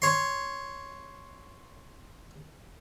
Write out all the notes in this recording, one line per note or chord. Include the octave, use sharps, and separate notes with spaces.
C#5 C6